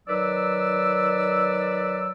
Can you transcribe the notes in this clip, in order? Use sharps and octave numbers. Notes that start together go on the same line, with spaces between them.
D#3 F#3 B4 D5 E6